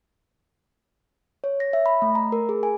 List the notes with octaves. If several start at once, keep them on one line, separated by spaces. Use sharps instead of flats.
C#5
A#6
E5
B5
A3
A#5
A#4
G#4
G#5